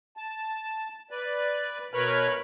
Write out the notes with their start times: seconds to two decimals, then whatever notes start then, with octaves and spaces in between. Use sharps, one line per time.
0.17 A5
1.11 B4 D5
1.93 B2 A#4 B4 C#5 B5 F6